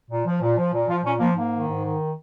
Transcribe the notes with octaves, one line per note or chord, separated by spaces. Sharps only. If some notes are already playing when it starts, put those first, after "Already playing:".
A#2
F3
A#2
F3
A#2
F3 F4
A#2 C#4
F3 A#3
G#2 A#3
D#3
G#2
D#3